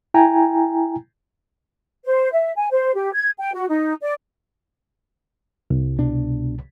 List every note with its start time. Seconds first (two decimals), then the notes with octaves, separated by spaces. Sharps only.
0.14 E4 G5 G#5 A#5
2.05 C5
2.32 E5
2.56 G#5
2.71 C5
2.95 G4
3.13 G#6
3.39 G5
3.53 F#4
3.68 D#4
4.01 D5
5.70 C2
5.99 B2 D4